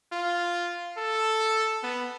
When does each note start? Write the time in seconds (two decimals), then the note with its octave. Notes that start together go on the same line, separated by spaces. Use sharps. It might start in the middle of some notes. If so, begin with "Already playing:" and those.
0.12 F4
0.98 A4
1.83 B3